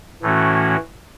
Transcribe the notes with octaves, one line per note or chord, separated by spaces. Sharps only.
A2 E3 A3 C#4 F#4